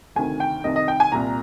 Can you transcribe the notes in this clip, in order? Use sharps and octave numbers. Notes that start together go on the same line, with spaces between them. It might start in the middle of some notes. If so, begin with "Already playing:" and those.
D2 C3 D#3 G#5
G5
C2 C3 D#3 D#5
D#5
G5
G#5
C2 A#2 A#5